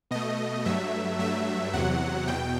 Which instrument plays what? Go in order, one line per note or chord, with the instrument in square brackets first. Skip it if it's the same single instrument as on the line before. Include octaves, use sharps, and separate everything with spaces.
[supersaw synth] B2 A3 D#5
G2 F#3 A3 E5
G2 F#3 A3 E5
E2 C3 F#3 F#5
E2 B2 G5